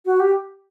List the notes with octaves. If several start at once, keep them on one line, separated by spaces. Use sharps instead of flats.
F#4
G4